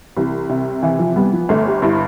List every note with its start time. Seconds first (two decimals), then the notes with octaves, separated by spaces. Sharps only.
0.17 C2 E3
0.49 C3
0.83 E3
0.99 F3
1.16 G3 B3
1.33 F3
1.49 G1 A3
1.66 G4
1.82 G2 E4